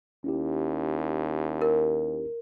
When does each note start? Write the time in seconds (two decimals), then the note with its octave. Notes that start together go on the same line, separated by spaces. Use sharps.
0.24 D#2 C#4 E4 G4
1.62 A#4